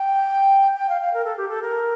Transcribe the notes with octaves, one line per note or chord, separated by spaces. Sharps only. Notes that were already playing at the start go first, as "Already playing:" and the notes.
Already playing: G5
G5
F5
F5
A#4
A4
G4
A4
A#4